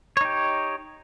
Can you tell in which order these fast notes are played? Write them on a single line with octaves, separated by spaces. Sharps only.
C#5 D#4 G4